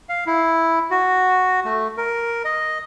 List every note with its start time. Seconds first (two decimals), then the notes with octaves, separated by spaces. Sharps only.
0.09 F5
0.27 E4
0.91 F#4
1.65 A3
1.97 A#4
2.45 D#5